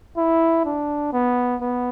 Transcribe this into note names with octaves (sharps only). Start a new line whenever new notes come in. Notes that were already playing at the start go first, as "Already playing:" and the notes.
E4
D4
B3
B3